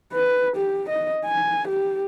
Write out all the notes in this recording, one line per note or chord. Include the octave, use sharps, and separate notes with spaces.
B4
G4
D#5
G#5
G4